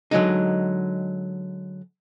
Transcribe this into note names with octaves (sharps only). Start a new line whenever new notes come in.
D3 F#3 G#3 D#4